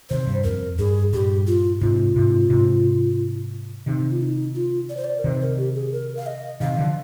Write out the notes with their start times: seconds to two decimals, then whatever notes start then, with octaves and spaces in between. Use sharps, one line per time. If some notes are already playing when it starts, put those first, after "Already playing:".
0.10 C3 D#3 C5
0.27 G2
0.44 F2 A#4
0.78 G2 G#4
1.13 G2 A#2 G4
1.47 F4
1.81 G#2 C3 F4
2.16 G#2 C3
2.50 G#2 C3
3.86 C3 D#3 D#4
4.11 F4
4.21 D#4
4.55 F4
4.89 D5
4.97 C5
5.04 D5
5.19 A#4
5.24 C3 D#3 C5
5.41 A#4
5.57 G4
5.75 G#4
5.92 A#4
6.17 F5
6.26 D#5
6.60 C3 D#3 F5
6.78 D3 F3